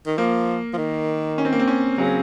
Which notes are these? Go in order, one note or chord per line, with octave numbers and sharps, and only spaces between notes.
D#3
F3 A#3
F3
D#3
C#4
C4
A#3
C4
C#4
C#3 F#3